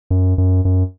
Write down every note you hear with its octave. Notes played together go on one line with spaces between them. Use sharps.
F#2
F#2
F#2